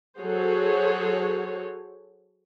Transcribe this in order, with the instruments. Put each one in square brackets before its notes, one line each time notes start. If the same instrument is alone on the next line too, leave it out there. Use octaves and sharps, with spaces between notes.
[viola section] F#3 F#4 G#4 A4 C5 C#5